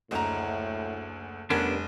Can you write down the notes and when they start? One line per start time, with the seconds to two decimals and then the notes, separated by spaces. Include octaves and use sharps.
0.11 F#1 D2 A2 D#5 A#5
1.50 F1 G2 B3 C#4 D4 A#4